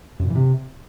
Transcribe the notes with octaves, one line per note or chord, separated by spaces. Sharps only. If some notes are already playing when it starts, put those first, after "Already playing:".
F#2
A#2
E3
C3